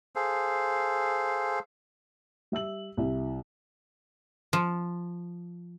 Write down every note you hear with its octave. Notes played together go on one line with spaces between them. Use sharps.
G#4 A4 C5 F5
G3 E5 E6 F#7
C2 E4 E5
F3